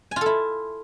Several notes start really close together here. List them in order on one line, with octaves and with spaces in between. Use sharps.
G#5 F4 A4 E4